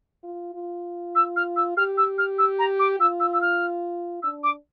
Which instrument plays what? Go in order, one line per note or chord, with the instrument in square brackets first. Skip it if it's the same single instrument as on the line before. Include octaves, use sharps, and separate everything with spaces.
[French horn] F4
F4
[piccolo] E6
F6
E6
[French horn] G4 [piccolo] F6
[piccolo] E6
F6
E6
A#5
D6
[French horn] F4 [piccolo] E6
[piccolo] E6
E6
F6
[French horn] D4 [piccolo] E6
[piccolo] D6